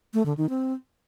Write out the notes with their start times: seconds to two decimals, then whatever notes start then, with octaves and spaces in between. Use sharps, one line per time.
0.14 A3
0.26 D3
0.37 D#3
0.49 C4